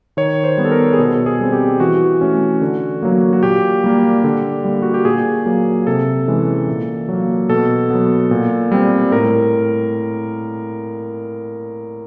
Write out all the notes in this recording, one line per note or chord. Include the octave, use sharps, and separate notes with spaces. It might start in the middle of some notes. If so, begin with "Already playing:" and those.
D#3 C#5
C5
G3 B3
A4
A#4
G#4
B2 A4
G#4
G3 C4
G4
E3 F#4
A3 C#4
D3
F#3 A#3
F#4
A#2 G4
G3 A#3
D3
G3 A#3
F#4
G4
A#2 G#4
F#3 A#3
C3 A4
E3 G#3 C#4
A#2
F#3 A#3
B2 A4
F#3 B3
A#2
G3 C4
A2 A#4